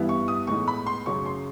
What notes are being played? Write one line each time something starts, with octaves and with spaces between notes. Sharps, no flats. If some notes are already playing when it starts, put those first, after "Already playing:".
Already playing: G2 E3 G3 B3 E4
C#6
D#6
A2 E3 G#3 B3 D#4 C#6
B5
C6
F#2 C#3 F#3 C#6
C6